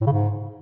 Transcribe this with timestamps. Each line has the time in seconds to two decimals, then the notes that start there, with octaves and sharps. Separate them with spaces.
0.01 A2
0.07 C#3
0.12 G#2